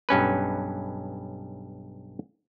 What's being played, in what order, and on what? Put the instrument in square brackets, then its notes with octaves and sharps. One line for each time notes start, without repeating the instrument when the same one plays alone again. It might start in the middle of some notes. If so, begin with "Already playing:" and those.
[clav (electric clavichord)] B1 G2 C#4 B4